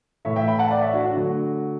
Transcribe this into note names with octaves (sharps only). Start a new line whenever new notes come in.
A2 E3 A3 C#5 E5
E5 G5
G5 B5
F#5 A5
D5 F#5
C#5 E5
D4 F#4
D4 F#4
D3 F#3 A3